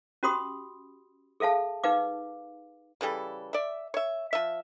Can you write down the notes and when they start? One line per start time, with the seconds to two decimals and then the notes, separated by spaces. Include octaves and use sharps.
0.23 C#4 F#4 G4 B5 C6 D#6
1.40 G#4 A4 E5 F5 A5
1.84 D#4 B4 F5 D6
3.01 C#3 E3 G3 A4
3.53 D5 E5
3.94 C#5 E5
4.33 F3 E5